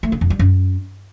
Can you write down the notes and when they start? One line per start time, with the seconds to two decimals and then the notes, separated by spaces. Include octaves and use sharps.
0.03 A3
0.12 C#3
0.21 F2
0.30 G3
0.39 F#2